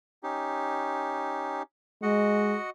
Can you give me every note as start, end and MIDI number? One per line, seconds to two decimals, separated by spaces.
0.23 1.62 61
0.23 1.62 63
0.23 1.62 67
2.03 2.57 56
2.03 2.70 66
2.03 2.70 75
2.03 2.70 78